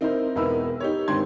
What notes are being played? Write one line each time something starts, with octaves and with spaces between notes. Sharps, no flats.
C4 D#4 E4 A#4 C5
E1 D#4 E4 A#4 B4 E6
D#4 G4 C#5
G#1 D#3 C4 D4 C6 G#6